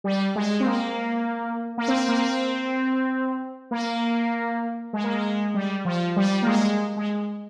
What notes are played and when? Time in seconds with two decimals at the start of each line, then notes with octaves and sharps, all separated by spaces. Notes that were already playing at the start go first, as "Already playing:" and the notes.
0.04 G3
0.36 G#3
0.60 C4
0.65 A#3
1.78 A#3
1.88 C4
2.08 A#3
2.18 C4
3.71 A#3
4.93 G#3
5.04 A#3
5.13 G#3
5.54 G3
5.85 F3
6.16 G3
6.42 A#3
6.46 G#3
6.96 G#3